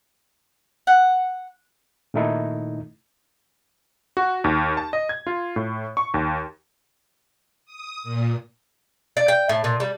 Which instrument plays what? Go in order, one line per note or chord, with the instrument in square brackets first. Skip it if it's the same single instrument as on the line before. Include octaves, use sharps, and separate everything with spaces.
[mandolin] F#5
[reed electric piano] A#2 D#3 A3 D#4 E4
[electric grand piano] F#4
D#2
A5
D#5
G#6
F4
A2
C#6
D#2
[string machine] D#6
A#2
[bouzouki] D5
G5
A2
A#2
G3